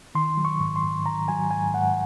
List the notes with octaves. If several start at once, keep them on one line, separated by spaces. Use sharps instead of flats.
D#3 C6
F#3
C#6
G#2
C6
G#2
D#3 A#5
F#3 G#5
G#2 G#5
G#2 F#5